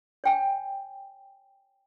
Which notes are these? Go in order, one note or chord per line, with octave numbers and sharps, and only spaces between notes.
C#5 G5 G#5